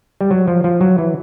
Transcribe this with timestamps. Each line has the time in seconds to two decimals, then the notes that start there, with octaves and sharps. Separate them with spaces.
0.21 G3
0.31 F#3
0.47 F3
0.64 F3
0.81 F#3
0.98 E3